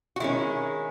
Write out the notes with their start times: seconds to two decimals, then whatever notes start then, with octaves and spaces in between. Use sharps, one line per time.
0.16 F#4
0.20 D#3 G#3 C#4 E4